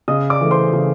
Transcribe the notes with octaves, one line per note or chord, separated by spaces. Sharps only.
C#3 D#5 D#6
D5 D6
E3 A3
C5 C6
C#3